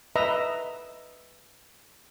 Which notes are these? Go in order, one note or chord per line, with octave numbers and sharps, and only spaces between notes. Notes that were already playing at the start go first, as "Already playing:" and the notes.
B4 D#5 E5 A#5